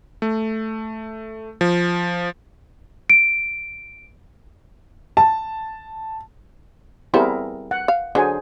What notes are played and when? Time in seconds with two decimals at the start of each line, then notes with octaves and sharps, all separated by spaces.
0.22 A3
1.61 F3
3.10 D7
5.17 A5
7.14 G3 B3 C4 E4 G#4 A#4
7.71 F#5
7.88 F5
8.15 D3 F#3 G#4 C5 G#5